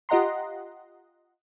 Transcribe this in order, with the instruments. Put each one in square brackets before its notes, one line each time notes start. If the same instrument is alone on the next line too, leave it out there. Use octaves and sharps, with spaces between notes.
[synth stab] F4 G4 D#5 F#5 A#5 C6